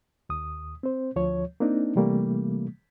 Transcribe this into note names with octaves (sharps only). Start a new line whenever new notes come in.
D#2 D#6
C4 C5
D2 F3 C#5
A#3 C4 D4 D#4
C3 E3 G3 A3 A#3